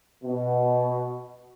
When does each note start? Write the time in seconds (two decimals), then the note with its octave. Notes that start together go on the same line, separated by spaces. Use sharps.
0.24 B2